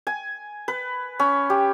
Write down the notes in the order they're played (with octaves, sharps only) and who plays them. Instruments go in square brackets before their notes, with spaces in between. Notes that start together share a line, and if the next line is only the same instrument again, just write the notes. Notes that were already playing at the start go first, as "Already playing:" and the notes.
[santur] G#5
B4
C#4
G4